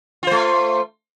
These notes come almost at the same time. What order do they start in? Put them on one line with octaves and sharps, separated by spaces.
F4 C5 A3